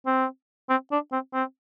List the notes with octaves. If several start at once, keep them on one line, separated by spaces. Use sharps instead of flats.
C4
C4
D4
C4
C4